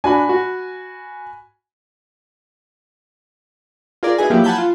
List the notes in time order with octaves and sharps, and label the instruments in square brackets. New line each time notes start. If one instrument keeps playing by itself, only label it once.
[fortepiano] D4 F#4 [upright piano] G#5 B5
[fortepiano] F#4
[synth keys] F4 G#4 A#4 D5
D#4 E4 F#4 G#4 B4 G#5
F3 F#3 A#3 E4 F4 G4
F#5 G#5 A5 B5 G6
F4